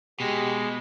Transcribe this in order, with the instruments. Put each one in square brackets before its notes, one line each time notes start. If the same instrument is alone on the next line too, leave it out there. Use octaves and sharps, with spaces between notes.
[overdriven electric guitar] B2 [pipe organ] G#3 [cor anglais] G4